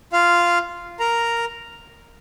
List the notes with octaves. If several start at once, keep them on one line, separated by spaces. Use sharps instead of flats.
F4 F5
A#4 A#5